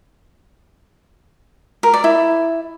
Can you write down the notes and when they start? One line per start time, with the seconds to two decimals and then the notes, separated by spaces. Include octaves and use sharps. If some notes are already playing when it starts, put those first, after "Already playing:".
1.83 A#4
1.94 D5
2.04 E4